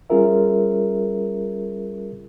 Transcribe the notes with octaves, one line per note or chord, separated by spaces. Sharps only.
G3 C#4 F4 G#4 A#4 E5